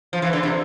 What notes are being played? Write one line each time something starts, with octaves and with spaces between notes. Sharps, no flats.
F3
E3
D3
C3